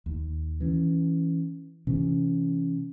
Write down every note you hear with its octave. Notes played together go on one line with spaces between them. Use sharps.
D#2
E3 C#4
C3 E3 C#4